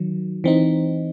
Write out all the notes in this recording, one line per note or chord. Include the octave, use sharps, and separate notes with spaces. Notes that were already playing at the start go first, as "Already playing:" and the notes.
Already playing: D#3 F#3
E3 C4 D#4